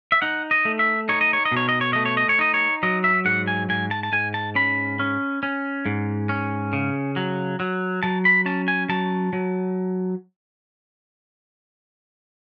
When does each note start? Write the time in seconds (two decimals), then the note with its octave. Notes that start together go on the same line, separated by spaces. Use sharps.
0.12 E5
0.22 D#4 F#5
0.51 D#5
0.65 A3
0.79 E5
1.09 D#4 C#5
1.21 D#5
1.33 C#5
1.45 D#5
1.52 B2
1.57 C#5
1.69 D#5
1.81 C#5
1.93 A3 D#5
2.05 C#5
2.17 D#5
2.29 C#5
2.39 D#4 D#5
2.54 C#5
2.83 F#3 D#5
3.04 E5
3.25 G#2 F#5
3.47 G#5
3.69 G#2 G#5
3.91 A5
4.03 A5
4.12 G#2 G#5
4.34 A5
4.55 C#4 B5
5.00 C#4
5.43 C#4
5.86 G#2
6.29 C#4
6.73 C#3
7.16 F#3
7.60 F#3
8.03 F#3 A5
8.25 B5
8.46 C#4 A5
8.68 G#5
8.89 F#3 A5
9.33 F#3